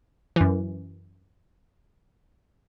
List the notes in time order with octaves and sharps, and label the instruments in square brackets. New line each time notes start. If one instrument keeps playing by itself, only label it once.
[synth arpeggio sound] F#2 E3